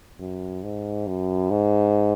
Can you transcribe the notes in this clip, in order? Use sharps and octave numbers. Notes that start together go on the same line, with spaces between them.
F#2
G#2
F#2
G#2